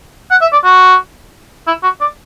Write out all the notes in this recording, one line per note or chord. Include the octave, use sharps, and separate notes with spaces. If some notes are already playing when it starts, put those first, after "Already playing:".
F#5
E5
D5
F#4
E4
F#4
D5